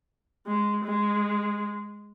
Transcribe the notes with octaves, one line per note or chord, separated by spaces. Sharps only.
G#3
G#3